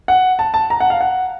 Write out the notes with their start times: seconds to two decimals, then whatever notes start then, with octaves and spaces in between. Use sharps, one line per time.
0.08 F#5
0.39 A5
0.54 A5
0.70 A#5
0.80 F#5
0.90 F5
1.01 F#5